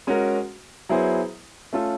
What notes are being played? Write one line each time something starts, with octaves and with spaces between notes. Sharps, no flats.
G#3 C#4 F#4 A#4
F#3 B3 E4 G#4 C5
A3 C#4 F4 A4